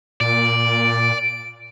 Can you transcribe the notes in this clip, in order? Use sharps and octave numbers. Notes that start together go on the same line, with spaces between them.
A#2 D5 D7